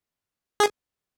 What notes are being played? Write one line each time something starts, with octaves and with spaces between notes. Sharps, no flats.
G#4